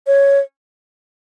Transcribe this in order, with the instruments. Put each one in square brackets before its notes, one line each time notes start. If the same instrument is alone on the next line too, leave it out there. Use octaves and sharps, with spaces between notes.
[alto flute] C#5